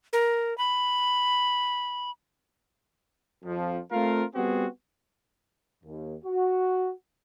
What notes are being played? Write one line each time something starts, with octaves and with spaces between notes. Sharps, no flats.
A#4
B5
F2 F3
A3 C4 F4 A#4 F5
G3 B3 C4 F#4 G#4
D#2
F#4